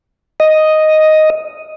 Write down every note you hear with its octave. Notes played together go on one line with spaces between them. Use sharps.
D#5